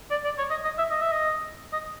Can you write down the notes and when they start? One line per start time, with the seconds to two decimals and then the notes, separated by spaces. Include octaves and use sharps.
0.11 D5
0.25 D5
0.38 C#5
0.51 D#5
0.64 D#5
0.78 E5
0.91 D#5
1.02 E5
1.12 D#5
1.72 D#5